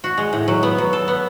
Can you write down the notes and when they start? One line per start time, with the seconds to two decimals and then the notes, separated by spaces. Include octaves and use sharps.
0.04 F#4
0.18 G#3
0.33 A2
0.48 F#3
0.63 B3
0.78 F#3
0.93 A4
1.08 B3